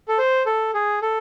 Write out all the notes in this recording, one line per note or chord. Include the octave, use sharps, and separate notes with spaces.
A4
C5
A4
G#4
A4